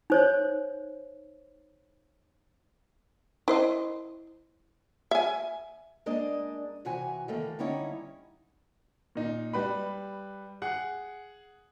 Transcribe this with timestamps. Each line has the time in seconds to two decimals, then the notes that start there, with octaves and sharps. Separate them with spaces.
0.10 D#4 C5 C#5
3.48 E4 C5 D#5
5.11 E5 G#5
6.06 G#3 A#3 D4 D#5
6.85 C3 E3 F#4 G#5
7.28 D#3 E3 A3 A#3
7.59 D3 G3 C#4 D#4 E4 C#5
9.15 A#2 D#4
9.53 G3 B4 B5
10.62 G#4 F#5